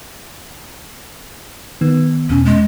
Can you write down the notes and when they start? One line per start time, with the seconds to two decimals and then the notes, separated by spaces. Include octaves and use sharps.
1.81 D#3 B3
2.30 E2 B2 C#4
2.45 G#3